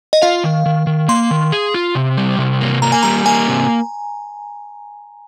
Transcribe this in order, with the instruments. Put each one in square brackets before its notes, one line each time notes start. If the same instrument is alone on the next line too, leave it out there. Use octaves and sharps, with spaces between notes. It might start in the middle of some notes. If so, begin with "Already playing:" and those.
[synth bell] D#5
[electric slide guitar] F4 [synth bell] F5
[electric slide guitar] D#3
D#3
D#3
[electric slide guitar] A#3 [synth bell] C6
[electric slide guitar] D#3
G#4
F4
C3
G3
C3
A#3
[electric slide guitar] A#3 [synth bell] A#5
[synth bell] G#5
[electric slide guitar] G3 [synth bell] A#5
[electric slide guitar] A#3 [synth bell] G#5
[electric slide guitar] C3